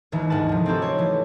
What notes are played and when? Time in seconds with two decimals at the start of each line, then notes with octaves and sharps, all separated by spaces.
0.12 G#1 D#2 D#3 E3
0.30 D2 G#2 D#4 F#5 A5
0.49 C3 F3
0.66 C4 D#4 F#4 G4 A4
0.82 C5 C#5
0.98 E3 A3